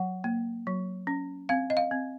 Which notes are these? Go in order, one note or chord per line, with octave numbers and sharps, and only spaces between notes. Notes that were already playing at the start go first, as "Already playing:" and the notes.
Already playing: F#3 F#5
A#3
F#3
C#4
C4 F5
D#5
F5
C4